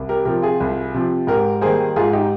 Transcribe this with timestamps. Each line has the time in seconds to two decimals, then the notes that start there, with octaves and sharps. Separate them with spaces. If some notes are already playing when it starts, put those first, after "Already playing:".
Already playing: C2
0.09 G4 A#4
0.25 C3 F3 G4 A#4
0.42 F4 G#4
0.60 C2
0.94 C3 F3
1.27 G#2 G4 A#4
1.61 D#3 G3 A#3 G#4 C5
1.96 G#2 F4 G#4
2.13 D#4 G4